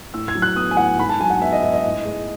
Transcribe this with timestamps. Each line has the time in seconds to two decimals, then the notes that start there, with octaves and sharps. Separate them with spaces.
0.14 A2 E6
0.28 G#6
0.35 F#3
0.42 F#6
0.56 B3 D#6
0.71 G#5
0.77 A2 F#5
0.99 G#2 B5
1.09 A5
1.20 F#3 G#5
1.30 F#5
1.42 B3 E5
1.52 D#5
1.63 G#2 E5
1.73 D#5
1.84 A2
2.05 G#3